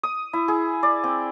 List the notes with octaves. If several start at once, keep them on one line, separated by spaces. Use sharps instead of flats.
D#6
E4
G#4
D5
C4